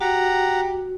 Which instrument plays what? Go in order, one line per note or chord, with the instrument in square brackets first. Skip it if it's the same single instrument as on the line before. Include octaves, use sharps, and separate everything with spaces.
[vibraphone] F#4 [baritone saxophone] G4 [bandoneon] F#5 A#5